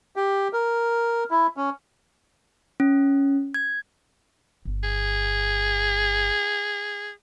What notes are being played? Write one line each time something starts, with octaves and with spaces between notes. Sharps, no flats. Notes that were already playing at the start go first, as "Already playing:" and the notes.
G4
A#4
E4
C#4
C#4
G#6
G1
G#4